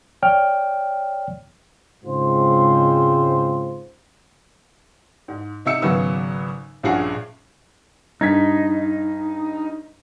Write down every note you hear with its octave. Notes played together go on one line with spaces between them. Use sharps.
C#5 D5 G5 F6
G#2 C#3 G#3 C4 F4 C5
G#2
C3 D#4 E5 E6 C#7
G#1 C#3 F#3 B3 E6
A#1 G2 C#4 G#4 F#5 C7
G2 D#4 G#6 B6